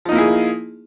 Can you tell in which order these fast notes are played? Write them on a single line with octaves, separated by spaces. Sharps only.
F3 D#4 A#3 E4 G#4